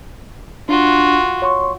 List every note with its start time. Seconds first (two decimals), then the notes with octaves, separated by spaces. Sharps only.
0.69 D4 F4 F#4
1.42 C#5 C6 C#6